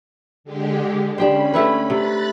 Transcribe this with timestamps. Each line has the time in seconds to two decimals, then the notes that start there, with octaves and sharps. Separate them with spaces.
0.44 D3 G#3 G4
1.18 C#4 D4 G4 C5 B5
1.54 A3 E4 B4
1.90 C3 B5 F#6 A6